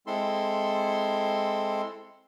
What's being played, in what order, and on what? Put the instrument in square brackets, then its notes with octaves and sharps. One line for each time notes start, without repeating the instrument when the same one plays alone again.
[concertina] G#3 C4 E4 A4 C6